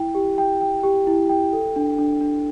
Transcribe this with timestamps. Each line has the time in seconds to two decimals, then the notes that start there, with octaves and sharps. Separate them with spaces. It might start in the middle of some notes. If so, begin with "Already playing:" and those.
Already playing: E4 G5
0.15 G4
0.38 G5
0.61 G5
0.83 G4
1.07 E4
1.29 G5
1.53 A4
1.76 D4
1.98 D4
2.21 D4